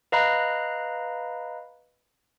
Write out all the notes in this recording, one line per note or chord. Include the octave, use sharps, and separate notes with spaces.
B4 D#5 F5 A#5 B5 F#6